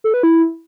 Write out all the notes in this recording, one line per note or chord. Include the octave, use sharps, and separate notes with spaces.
A4
B4
E4